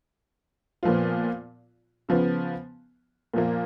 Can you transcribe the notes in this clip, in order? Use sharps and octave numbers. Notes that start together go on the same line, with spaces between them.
A#2 F3 B3 F4
C#3 F3 B3
A#2 F3 A#3